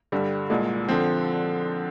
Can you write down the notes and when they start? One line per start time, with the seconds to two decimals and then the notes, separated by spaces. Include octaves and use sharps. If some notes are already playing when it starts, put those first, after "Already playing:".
0.12 G2 D3 G3
0.50 C2 A#2 G#3
0.88 D3 F3 C4